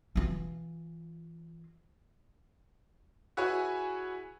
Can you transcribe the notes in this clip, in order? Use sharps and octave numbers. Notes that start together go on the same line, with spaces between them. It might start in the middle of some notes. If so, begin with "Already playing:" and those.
E3 F4
E4 F#4 G#4 B4 C#5 G#5